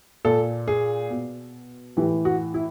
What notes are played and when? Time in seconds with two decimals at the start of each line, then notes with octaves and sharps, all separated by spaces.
0.25 A#2 A4
0.68 G#4
1.10 B2
1.97 A2 E3 G4
2.25 F#4
2.54 E4